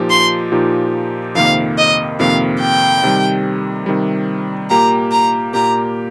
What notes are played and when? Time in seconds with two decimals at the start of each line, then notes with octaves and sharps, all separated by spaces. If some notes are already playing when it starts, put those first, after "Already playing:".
Already playing: A#2 F3 D#4 G4
0.10 C6
0.52 A#2 F3 D#4 G4
1.35 F2 C3 D#3 A#3 F5
1.78 D#5
2.19 F2 C3 D#3 A#3 F5
2.60 G5
3.03 C3 D#3 G3
3.86 C3 D#3 G3
4.70 A#2 A#3 G4 A#5
5.11 A#5
5.54 A#2 A#3 G4 A#5